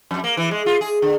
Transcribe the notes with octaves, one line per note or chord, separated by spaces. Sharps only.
F2
A#3
E3
G#3
F4
G#4
D3